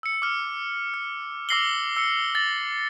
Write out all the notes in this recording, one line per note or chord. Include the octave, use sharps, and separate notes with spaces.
E6 C#7
D6 F6
F6
D6 E6 A#6 C7 F#7 G7
E6 C#7
A6 A#6 F#7